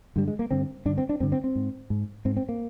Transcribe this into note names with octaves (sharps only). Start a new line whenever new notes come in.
G2 D3 G3
G#3
A#3
G2 D3 C4
G2 D3 D4
C4
D4
G2 D3 C4
C4
C4
G#2
G#2
G#2 C4
C4
A#3